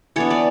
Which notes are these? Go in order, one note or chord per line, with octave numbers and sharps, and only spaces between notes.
E3 B3 D4 A4 C#5
B4 D5